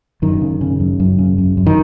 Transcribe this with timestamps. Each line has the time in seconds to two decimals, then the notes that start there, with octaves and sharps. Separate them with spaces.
0.22 F#2 D#3
0.41 C#3
0.61 C#3
0.80 F#2
1.00 F#2
1.19 C#3
1.38 F#2
1.57 F#2
1.67 D#3